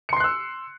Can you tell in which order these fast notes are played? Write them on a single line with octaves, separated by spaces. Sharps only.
C#7 C6 C7 F#6 E6